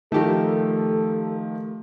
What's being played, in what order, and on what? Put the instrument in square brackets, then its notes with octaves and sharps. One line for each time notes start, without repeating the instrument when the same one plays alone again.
[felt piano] D#3 F3 [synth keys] A3 G4 A#4 [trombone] A4